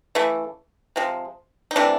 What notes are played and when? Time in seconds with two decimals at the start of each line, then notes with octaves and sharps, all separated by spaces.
0.15 C#3 E3 A3
0.96 C3 F3 G#3
1.71 D#4
1.76 C3 E3 A3 D4